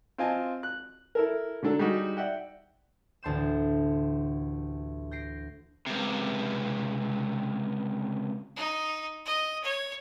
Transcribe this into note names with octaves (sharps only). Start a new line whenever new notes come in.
C4 F4 D#5 G#5 A5
F#6
E4 A4 A#4
D3 F#3 D4 A4
G3 D#4 F#4 G#4
D5 E5 F#5 G5
A1 D2 A5 C6 G6 E7
G6 A#6 C7 D7
C#2 C3
D#4
D#5
C#5